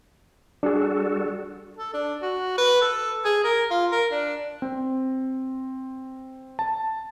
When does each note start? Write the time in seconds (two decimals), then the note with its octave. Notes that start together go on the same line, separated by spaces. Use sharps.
0.63 G3 D4 F#4 G#4 A4
1.77 A4
1.94 D4
2.22 F#4
2.58 B4
2.81 A4
3.25 G#4
3.44 A#4
3.71 F4
3.92 A#4
4.11 D4
4.62 C4
6.59 A5